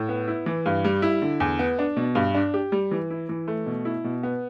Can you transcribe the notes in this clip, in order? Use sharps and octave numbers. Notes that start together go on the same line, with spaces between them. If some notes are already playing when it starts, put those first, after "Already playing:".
Already playing: A2
B3
E4
E3
G2
G3
E4
D3
E2
B3
D4
B2
G2
D4
G4
G3
E3
E4
E3
A3
B2
E4
B2
B3